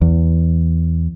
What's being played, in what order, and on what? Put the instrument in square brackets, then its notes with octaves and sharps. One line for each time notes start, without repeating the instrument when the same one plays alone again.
[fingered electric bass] E2